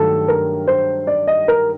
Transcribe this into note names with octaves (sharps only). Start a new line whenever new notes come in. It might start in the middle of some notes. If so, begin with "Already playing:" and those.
Already playing: G2 D#3 F#3 A3 A4
A#4
C5
D5
D#5
A#4